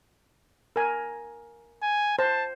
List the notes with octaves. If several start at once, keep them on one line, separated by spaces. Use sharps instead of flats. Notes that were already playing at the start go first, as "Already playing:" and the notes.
A#4 G#5
G#5
C5 A5